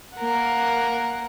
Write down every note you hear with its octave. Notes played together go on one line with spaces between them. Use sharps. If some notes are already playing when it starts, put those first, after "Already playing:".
A#3 A#4 F#5